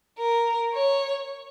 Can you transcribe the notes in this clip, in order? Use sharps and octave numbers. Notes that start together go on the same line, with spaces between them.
A#4
C#5